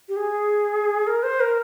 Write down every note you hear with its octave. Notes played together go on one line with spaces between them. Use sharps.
G4
G#4
A#4
C5
A#4